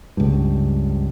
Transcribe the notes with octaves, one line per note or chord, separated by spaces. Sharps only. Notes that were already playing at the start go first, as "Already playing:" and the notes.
C#2 G2